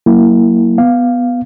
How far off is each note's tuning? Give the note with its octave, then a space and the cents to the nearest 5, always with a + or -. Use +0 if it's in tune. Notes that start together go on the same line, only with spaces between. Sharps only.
F#3 +0 A#3 +0 E4 +0
B3 +0 F5 +0